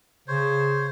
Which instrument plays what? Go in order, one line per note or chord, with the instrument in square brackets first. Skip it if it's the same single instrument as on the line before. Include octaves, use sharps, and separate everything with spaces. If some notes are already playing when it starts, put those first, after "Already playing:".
[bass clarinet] C#3 [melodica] C5 C#5